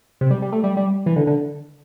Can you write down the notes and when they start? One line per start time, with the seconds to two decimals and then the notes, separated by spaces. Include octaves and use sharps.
0.21 C3
0.31 G3
0.42 G3
0.52 A3
0.64 G3
0.77 G3
1.06 E3
1.16 D3
1.27 D3